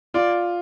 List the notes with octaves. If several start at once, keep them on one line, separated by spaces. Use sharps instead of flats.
F4 D5